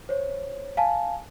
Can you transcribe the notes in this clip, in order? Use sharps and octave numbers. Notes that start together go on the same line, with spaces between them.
C5 C#5
F5 G#5 A5